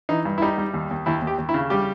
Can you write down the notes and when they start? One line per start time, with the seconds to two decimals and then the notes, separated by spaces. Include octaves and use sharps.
0.09 E3 D#4
0.25 G2
0.38 E4
0.42 G3 D#4
0.58 G3
0.73 D#2
0.91 D#2
1.06 D#2 E4
1.22 D#2
1.27 G4
1.38 D#2
1.49 E4
1.54 C#3
1.70 G3 G4